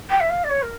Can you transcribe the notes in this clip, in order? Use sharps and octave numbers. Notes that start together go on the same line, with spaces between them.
G5
E5
F5
D5
C#5
A#4